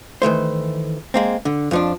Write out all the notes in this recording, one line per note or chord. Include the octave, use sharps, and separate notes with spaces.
D#3 E3 A3 C5
G#3 A#3 C4
D3
F2 F3 D4